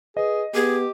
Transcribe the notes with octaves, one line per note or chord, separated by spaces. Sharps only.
G#4 B4 D#5
B3 G4 G#4